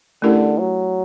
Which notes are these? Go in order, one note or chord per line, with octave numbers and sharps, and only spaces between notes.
D3 A3 C#4 E4 G4 A#4
F#3